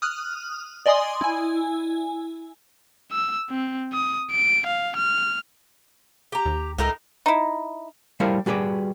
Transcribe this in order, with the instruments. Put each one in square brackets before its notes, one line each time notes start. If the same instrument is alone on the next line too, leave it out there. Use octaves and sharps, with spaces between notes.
[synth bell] D#6 F6 F#6
D5 D#5 G#5 C6 D#6
E4 G#5
[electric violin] E6
C4
D#6
D7
F5
F6
[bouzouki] G4 A#5
[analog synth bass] D#2
[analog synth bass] C#2 [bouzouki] A2 D#4 A#4
[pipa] D#4 E4
[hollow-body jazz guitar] G3 A3 E4 A#4 C5 F5
G3 F#4 G#4 B4 D5